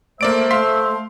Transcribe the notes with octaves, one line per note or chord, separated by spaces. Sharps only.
A3 A#3 C5 D5 E5 D7
A3 F5 C6 B6